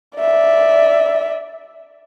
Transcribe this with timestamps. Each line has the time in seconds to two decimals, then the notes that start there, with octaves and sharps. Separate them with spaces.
0.18 D5 E5